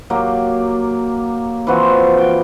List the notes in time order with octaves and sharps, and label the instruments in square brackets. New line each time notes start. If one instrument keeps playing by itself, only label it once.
[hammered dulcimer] F#3 A#3 G4
E3 F3 C4 F#4
G5